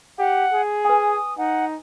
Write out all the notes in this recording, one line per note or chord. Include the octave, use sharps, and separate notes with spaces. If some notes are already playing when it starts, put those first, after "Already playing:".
G4 F#5
G#4
B4 G#5 D#6
D#4 F#5